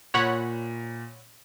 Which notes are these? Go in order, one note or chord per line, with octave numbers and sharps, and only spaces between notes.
A#2 C#5 F#5 B5